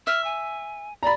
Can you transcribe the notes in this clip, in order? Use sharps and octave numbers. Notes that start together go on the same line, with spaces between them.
E5 F6
G#5
D5 A#5 B5